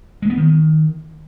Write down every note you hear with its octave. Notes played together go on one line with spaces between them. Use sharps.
G#3
B3
D#3